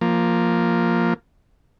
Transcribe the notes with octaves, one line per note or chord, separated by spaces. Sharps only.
F3 A#3